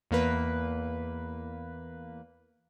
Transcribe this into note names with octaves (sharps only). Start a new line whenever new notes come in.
E2 A#3 B4